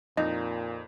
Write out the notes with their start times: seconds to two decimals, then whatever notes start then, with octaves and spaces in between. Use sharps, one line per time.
0.17 F2 A#2 D#4 D#5